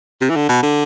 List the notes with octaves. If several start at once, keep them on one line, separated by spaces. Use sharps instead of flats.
C3
E3
D3
B2
D3